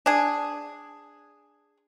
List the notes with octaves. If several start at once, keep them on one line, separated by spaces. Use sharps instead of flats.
D4 G#4